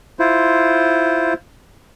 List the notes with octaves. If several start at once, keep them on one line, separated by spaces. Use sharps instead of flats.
E4 F4 C5